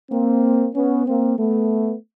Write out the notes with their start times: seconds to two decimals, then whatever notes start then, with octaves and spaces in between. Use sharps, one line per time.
0.12 A#3 C4
0.75 B3 C#4
1.07 A#3 C4
1.38 A3 B3